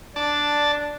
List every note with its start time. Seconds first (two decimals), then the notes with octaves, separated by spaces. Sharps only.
0.16 D4 D5 A5